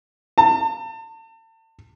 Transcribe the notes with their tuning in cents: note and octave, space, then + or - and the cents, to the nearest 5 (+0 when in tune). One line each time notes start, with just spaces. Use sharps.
A5 +35